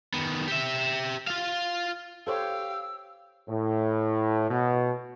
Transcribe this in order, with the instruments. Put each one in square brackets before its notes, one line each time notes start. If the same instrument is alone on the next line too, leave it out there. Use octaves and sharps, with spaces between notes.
[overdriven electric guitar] D#3 B3
G4 E5
F4 F5
[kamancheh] G4 F5 [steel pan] A4 C5 C#5 [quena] E6
[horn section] A2
B2